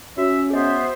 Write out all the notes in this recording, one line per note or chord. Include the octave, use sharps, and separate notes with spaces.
C#4 F#4 E5
B3 G#4 C5 D#5 E5